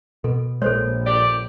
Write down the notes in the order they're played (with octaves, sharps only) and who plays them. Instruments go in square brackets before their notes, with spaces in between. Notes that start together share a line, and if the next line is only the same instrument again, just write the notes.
[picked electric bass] B2 B3 [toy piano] A4
[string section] A#1 [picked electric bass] G#3 [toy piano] A4 C5 C#5
[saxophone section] G4 D5